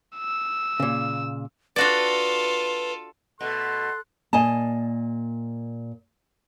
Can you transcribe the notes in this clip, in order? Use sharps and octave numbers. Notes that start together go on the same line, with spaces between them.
E6
A#2 C#3
D4 F4 F#4 A4 B4 D5
B2 A3 A4 C6 F#6
A#2 D#5 G#5 A5